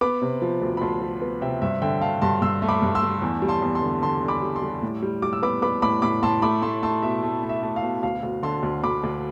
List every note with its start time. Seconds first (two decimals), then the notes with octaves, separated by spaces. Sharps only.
0.01 B3 B5 D6
0.22 C3
0.42 F3
0.62 D2
0.77 B5
0.81 D2 A5 C6
1.02 F3
1.21 B3
1.41 C3 E5 G5
1.62 G2 E5
1.82 D3 E5 G5
2.02 D3 F5 A5
2.21 G2 A5 C6
2.41 G2 C6 E6
2.62 A3
2.69 B5 D6
2.82 G2
2.95 C6 E6
3.02 A3
3.22 E2
3.42 G3
3.48 A5 C6
3.62 E2
3.75 A5 C6
3.82 D3
4.02 D3 A5 C6
4.22 D3
4.28 B5 D6
4.42 G3
4.55 A5 C6
4.62 G3
4.82 A2
5.02 G3
5.22 G3 D6
5.33 E6
5.42 B3 B5 D6
5.62 B3 B5 D6
5.82 A2 B5 D6
6.02 A2 B5 D6
6.23 A2 A5 C6
6.42 A3 B5 D6
6.62 A3 A5 C6
6.83 A3 A5 C6
7.02 B2 E5
7.23 A3
7.43 A3
7.49 E5
7.63 A3
7.76 F5
7.83 B2
8.03 D2 F5
8.23 D2
8.43 D3 A5 C6
8.63 D2
8.83 D2 B5 D6
9.03 D2